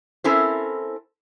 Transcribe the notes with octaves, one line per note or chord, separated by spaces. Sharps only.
C4 C#4 E4 A4 A#4 C5